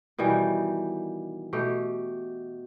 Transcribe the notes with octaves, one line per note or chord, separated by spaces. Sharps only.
B2 D#3 E3 G3
B2 A3 G4